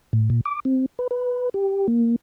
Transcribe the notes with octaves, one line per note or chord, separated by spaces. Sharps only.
A2
A#2
D6
C4
B4
B4
G4
A#3